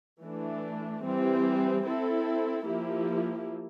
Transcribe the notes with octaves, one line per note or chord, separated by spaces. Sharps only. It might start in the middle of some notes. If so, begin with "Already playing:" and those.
E3 A3 D4
E3 G3 C4
C4 E4 A4
F3 A#3 E4 G4